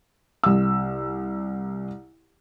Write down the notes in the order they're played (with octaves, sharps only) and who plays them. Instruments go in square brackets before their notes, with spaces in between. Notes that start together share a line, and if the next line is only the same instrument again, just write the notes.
[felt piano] C2 E6